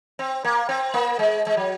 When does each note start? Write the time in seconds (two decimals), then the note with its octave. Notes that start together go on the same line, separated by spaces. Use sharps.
0.19 C4
0.44 A#3
0.69 C4
0.94 A#3
1.19 G#3
1.47 G#3
1.57 F#3